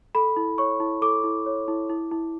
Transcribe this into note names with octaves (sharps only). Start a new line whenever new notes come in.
A4 B5
E4
C#5 C#6
E4
A4 D6
E4
C#5
E4
E4
E4